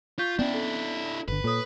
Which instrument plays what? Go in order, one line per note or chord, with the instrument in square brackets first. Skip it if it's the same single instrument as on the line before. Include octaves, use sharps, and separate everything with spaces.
[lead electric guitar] F4 [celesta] C#6 G6 B6
[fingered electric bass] B3 C#4 [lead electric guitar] D4 E4 [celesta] D5 G5
[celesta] A4
[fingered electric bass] G1 D3 [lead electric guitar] B4
[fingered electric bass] A#2 [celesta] A4 C#5 D#6